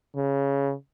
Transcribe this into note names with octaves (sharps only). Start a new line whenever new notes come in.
C#3